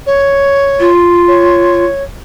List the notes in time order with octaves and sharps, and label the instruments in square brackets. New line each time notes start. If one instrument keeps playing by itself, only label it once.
[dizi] C#5
[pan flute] F4
[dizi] C#5